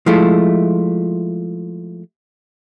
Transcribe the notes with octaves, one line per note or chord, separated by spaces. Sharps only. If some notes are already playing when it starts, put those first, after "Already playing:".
F3 G#3 A3 E4 F4